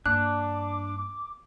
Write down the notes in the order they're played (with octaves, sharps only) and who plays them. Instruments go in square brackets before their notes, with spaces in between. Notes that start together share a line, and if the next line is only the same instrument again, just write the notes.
[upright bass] G2 A#3 [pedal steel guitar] D4 [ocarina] D6 [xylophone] F#6